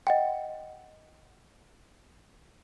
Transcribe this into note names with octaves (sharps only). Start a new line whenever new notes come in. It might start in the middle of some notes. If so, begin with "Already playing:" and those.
D#5 F#5 G5